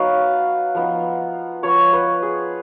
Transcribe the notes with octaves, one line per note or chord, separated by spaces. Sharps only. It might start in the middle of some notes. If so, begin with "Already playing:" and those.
Already playing: F#3 B3 D#4 B4 F5
F3 B3 D#4
F3 B3 F4 C#5
B4
G#4